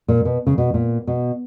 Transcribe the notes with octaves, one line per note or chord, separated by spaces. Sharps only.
A#2
B2
C#3
B2
A#2
B2